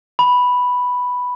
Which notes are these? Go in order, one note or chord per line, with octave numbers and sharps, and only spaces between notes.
B5